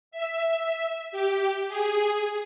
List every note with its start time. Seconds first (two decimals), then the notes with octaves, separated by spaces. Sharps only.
0.11 E5
1.12 G4
1.68 G#4